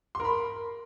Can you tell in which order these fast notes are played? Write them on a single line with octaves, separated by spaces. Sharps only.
C6 A#4 B5